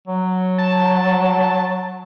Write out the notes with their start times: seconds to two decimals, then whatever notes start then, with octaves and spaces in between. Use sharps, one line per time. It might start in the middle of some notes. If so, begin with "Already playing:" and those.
0.07 F#3
0.58 A5